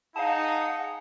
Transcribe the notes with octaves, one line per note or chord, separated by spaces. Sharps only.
D#4 G#4 F5 F#5 A5 D#6